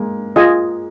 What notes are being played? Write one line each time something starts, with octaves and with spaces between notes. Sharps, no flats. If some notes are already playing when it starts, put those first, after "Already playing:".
Already playing: G#3 A#3
F4 G#4 D#5 G#5